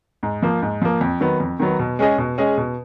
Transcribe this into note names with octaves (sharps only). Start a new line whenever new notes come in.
G#2
F3 A#3
G#2
F3 A#3
F2
D#3 F#3 B3
F2
D#3 F#3 B3
B2
G#3 C#4 G#4 D#5
B2
G#3 C#4 G#4 D#5
B2